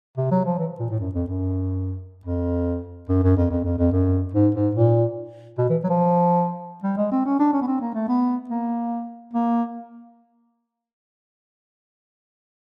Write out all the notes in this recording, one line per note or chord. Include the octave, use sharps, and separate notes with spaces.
C3
F#3
F3
E3
A#2
A2
F#2
F2
F#2
F2
F#2
F#2
F2
F2
F2
F2
F#2
G#2
G#2
A#2
B2
E3
F#3
F3
G3
G#3
C4
C#4
D4
C#4
B3
C4
A#3
A3
B3
A#3
A#3